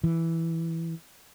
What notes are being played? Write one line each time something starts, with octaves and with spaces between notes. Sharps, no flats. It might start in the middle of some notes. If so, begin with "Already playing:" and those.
E3